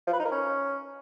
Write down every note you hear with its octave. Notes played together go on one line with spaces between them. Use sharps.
F3
B4
D#4
A#4
C#4